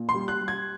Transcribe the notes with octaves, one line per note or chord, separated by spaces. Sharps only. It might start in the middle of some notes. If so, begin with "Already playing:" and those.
Already playing: A#2
C6
G3
F#6
G3
G#6